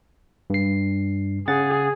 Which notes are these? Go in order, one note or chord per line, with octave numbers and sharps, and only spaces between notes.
G2 C7
C#3 G#4 F#5 A6